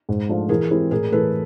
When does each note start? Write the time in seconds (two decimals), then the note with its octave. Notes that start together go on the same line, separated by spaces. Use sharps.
0.09 G#2
0.29 F3 A3 D4 F4
0.49 E3 G#4 A#4
0.71 G#3 C4 E4 G4
0.91 A2 G#4 A#4
1.12 E3 A3 A4 B4